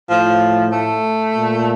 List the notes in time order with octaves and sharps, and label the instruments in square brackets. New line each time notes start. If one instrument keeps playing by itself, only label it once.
[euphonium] A2 [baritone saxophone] F3
[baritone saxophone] A3
[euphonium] A#2